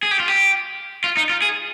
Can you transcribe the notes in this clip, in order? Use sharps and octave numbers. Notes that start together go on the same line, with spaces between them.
G#4
G4
F4
G4
F4
D#4
F4
G#4